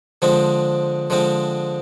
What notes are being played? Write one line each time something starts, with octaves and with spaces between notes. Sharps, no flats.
D3 F3 G#3 C4
D3 F3 G#3 C4